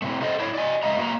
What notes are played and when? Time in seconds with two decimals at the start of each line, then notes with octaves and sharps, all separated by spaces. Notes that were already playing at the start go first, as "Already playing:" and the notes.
0.02 A2 C3 A3
0.22 A4 C5 D5 D#5
0.40 D4 E4 C#5
0.55 D5 D#5 G#5
0.83 F2 C#3 G#3 D#5 E5 A#5
0.97 A#3 F#4 B4 A#5